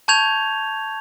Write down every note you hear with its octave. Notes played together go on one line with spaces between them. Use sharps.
A5 C#6 G6 G#6 F7